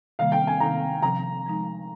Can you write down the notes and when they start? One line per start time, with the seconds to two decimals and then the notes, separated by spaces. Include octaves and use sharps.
0.19 C3 D#3 G3 A#3 F5
0.32 G5
0.47 G#5
0.60 C3 D#3 A#3 D#4 A#5
1.02 C3 F3 C4 A#5
1.46 F3 G#3 D#4